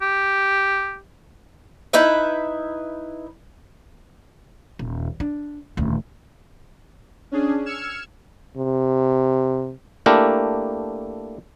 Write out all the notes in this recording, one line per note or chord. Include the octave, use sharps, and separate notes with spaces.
G4
D#4 E4 B4 E5
D#1
D4
D#1 D2
C#4 D4 G#4
E6 F6 G#6 C#7 E7
C3
A3 A#3 D4 E4 G4 A#4